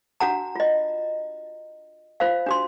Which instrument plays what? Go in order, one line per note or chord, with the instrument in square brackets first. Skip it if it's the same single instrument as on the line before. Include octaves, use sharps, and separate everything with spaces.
[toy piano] D4 F#4 F#5 A#5
F4 D#5
F4 C5 F5
D4 F#4 C6